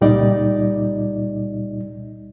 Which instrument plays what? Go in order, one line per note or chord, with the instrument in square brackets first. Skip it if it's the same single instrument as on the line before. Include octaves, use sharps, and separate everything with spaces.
[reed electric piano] C#2 A#2 G3 D#4 D5 D#5